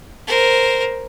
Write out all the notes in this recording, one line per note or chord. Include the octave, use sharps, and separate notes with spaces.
A#4 C5